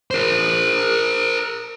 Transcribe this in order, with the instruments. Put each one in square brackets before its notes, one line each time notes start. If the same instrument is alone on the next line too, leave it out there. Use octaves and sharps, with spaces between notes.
[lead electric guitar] A#4 C5